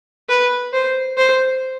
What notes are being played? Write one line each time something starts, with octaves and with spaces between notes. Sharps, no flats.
B4
C5
C5